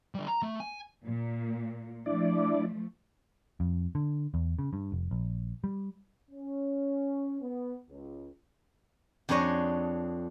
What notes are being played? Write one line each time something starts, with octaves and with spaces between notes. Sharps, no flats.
D3 G3
A#5
A3
G#5
A#2
F3 A3 D4 E4 D5
F2
D3
E2
C#3
G2
F1
A#1
G3
C#4
B3
C#2
F2 D4 G#4 C#5 D#5